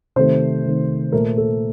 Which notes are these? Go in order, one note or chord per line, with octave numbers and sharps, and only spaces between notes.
C3 D#3 A3 C5
C3 D#3 A3
A#2 A3 A#4
A4